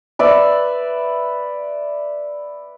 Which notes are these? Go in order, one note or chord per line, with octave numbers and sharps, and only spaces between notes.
B4 D5 E5